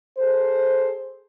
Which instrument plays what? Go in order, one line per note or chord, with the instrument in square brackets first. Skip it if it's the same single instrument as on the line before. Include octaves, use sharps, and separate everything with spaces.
[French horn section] G#4 A4 C5